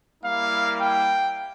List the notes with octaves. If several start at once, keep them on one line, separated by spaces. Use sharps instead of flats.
G3 A#3 E4 F5
G5